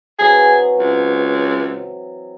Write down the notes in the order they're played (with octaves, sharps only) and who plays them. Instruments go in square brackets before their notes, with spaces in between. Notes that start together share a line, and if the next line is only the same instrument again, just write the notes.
[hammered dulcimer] E3 F#3 C4 [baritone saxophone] G#4
[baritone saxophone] C#2